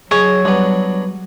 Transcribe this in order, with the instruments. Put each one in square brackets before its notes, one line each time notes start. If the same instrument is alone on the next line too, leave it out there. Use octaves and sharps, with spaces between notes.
[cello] F#3 [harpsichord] G#4 D#5 [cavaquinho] C#5
[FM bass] G3 [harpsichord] B3 D4